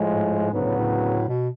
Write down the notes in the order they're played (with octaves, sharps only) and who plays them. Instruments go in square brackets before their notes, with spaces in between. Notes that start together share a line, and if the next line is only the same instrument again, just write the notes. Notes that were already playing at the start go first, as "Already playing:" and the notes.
Already playing: [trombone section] A2 F3 G#3
[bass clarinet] G#2
G#2
[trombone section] D2 C#3 F#3 B3 [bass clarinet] G#2
[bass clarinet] A2
A2
B2